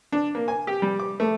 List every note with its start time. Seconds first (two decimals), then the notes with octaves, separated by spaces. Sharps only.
0.12 D4
0.35 A#3
0.48 G#5
0.67 G4
0.82 G3
0.99 D6
1.20 A3